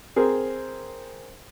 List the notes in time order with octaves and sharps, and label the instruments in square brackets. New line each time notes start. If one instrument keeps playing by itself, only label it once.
[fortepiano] C4 G#4 A#4 C5